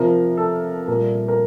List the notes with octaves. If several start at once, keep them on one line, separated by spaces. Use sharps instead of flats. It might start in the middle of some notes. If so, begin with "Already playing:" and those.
Already playing: C3 F3 A#4
A4
A#2 G3 A#4
A#4